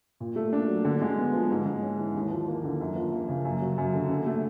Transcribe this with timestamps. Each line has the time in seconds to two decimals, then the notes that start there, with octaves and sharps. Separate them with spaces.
0.20 A#2
0.36 A3
0.53 D4
0.68 F#3
0.85 D3
1.02 G#3
1.18 B3
1.33 F3
1.51 G#2
1.66 G#3
1.82 C#4
1.98 E3
2.14 D#2
2.31 F3
2.48 A#3
2.64 D3
2.81 F#2
2.96 F3
3.12 A#3
3.29 C#3
3.45 F#2
3.62 F#3
3.78 F#2
3.94 D3
4.09 D3
4.26 A3